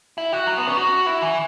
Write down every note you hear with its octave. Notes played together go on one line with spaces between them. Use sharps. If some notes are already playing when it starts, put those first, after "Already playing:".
E4
F#4
F#3
B3
C#4
F#4
E4
E3